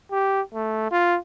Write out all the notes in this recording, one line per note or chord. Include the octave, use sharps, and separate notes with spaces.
G4
A3
F4